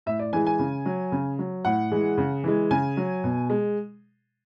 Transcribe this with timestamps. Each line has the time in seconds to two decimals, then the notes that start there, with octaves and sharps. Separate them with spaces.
0.06 A2 E5
0.19 D5
0.33 E3 G#3 G#5
0.47 G#5
0.59 C#3
0.85 F#3
1.12 C#3
1.39 F#3
1.65 A2 F#5
1.91 E3 G#3
2.18 C#3
2.44 E3 G#3
2.71 C#3 G#5
2.97 F#3
3.24 B2
3.50 G#3